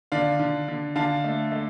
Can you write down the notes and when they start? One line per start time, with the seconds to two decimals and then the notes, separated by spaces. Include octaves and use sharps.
0.12 D3 D5 F5
0.40 D3
0.68 D3
0.96 D3 F5 A5
1.24 A3
1.52 A3